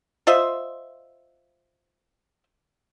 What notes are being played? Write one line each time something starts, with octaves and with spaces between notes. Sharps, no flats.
F4 C5 D#5 E5